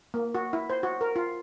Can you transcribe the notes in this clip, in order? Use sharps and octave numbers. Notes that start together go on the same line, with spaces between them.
A#3
F#4
E4
C5
F#4
A#4
F4